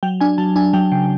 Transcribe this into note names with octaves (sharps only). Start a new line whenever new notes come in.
F#3 G5
D4 G#5
F#3 A5
D4 G#5
F#3 G5
C#3 G5